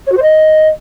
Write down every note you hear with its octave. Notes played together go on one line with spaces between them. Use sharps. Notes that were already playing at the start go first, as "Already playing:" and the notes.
C#5
F#4
C5
D#5